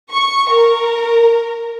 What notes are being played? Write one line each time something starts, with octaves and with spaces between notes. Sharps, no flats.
C#6
A#4